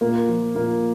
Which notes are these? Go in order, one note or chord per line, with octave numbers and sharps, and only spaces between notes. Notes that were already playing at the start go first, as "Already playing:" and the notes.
A#2 A#3
F3
A#2 A#3